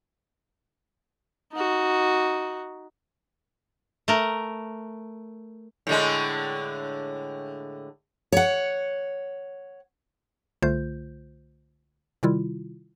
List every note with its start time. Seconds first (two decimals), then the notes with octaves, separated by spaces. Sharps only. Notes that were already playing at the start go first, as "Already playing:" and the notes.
1.53 D#4 F#4
4.08 A3 A#4 A#5
5.87 A2 D3 G#3
8.32 C#5 F#5
10.62 C2 D3 A3 F4 C5 G6
12.23 C3 D#3 G3 E4 F4